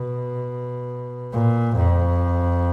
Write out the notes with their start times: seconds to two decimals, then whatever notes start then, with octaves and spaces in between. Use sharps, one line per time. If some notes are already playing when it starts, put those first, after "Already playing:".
Already playing: B2
1.32 A#2
1.76 F2